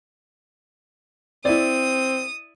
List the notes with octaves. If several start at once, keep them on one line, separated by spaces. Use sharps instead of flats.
C4 E4 D5 D#6